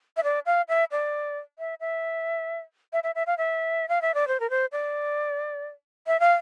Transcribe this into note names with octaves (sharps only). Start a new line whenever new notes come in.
E5
D5
F5
E5
D5
E5
E5
E5
E5
E5
F5
E5
F5
E5
D5
C5
A#4
C5
D5
E5
F5